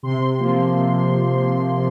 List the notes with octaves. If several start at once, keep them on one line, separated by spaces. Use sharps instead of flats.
C3 C6
F3 A#3
C3